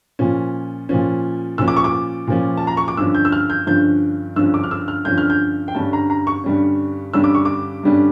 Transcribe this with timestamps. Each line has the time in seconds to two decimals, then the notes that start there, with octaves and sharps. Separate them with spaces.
0.19 A#2 F3 C#4
0.89 A#2 F3 C#4
1.58 A#2 F3 C#4 E6
1.68 D6
1.77 C#6
1.84 D6
2.27 A#2 F3 C#4
2.57 A5
2.67 A#5
2.77 C#6
2.88 D6
2.97 G2 D3 F3 C#4 E6
3.15 G6
3.25 E6
3.32 F6
3.50 G6
3.67 G2 D3 F3 C#4 G6
4.36 G2 D3 F3 C#4 E6
4.54 D6
4.64 F6
4.71 E6
4.88 F6
5.05 G2 D3 F3 C#4 G6
5.18 F6
5.30 G6
5.68 G5
5.75 G2 D3 G3 C#4 A5
5.93 A#5
6.10 A#5
6.27 C#6
6.44 G2 D3 G3 C#4
7.13 G2 D3 G3 C#4 E6
7.24 D6
7.35 C#6
7.45 D6
7.83 G2 D3 G3 C#4